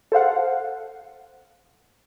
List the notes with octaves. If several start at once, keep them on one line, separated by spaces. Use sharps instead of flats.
A4 C5 F5 F#5